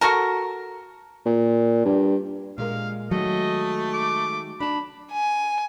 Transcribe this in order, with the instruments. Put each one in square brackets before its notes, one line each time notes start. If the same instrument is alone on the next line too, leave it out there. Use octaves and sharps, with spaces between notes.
[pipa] F#4 A4 A#4
[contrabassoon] A#2
G2
[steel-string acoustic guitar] A#2 G#3 A#4 [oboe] F5
[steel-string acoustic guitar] D#3 G#3 [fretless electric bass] F#3 [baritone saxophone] A3 [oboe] D#5
[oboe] D6
[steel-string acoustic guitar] D4 A5 [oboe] B5
[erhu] G#5